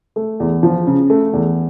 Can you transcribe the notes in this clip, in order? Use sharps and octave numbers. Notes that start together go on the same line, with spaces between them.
A3
E2
F3
C#3
A3
E2